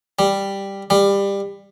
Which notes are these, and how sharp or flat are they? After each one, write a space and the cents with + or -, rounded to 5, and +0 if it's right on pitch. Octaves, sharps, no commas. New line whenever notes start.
G3 +5
G3 +20